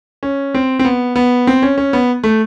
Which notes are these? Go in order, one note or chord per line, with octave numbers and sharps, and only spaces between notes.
C#4
C4
C4
B3
B3
C4
C#4
C#4
B3
A3